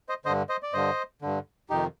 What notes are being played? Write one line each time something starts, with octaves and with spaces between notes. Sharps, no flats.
C5 D#5
G2 D3 C5 D#5
C5 D#5
D5
G2 D3 C5 D#5
G2 D3
F2 C3 D#3 D#4 G4